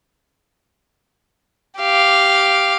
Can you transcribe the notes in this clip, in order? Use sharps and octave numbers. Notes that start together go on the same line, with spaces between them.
G4 F5